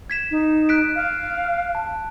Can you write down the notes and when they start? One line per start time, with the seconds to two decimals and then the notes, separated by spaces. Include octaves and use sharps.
0.10 G#6 B6 E7
0.31 D#4
0.69 F#6 B6 D7
0.95 F5
1.75 A5